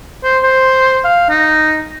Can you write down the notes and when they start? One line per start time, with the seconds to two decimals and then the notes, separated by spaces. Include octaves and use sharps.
0.24 C5
0.43 C5
1.04 F5
1.30 D#4